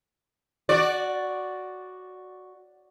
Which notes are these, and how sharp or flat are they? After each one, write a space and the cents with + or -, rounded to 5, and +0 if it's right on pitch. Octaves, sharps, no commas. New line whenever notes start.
F#4 +0 D5 +0